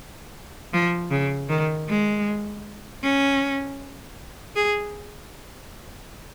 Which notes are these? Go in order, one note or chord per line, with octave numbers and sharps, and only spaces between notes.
F3
C#3
D#3
G#3
C#4
G#4